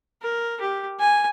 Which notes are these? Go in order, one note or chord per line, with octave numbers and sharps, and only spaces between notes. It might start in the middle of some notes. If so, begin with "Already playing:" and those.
A#4
G4
G#5